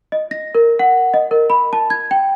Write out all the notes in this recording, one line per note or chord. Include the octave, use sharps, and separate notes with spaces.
D#5
A#6
A#4
F#5
D#5
A#4
B5
A5
G#6
G5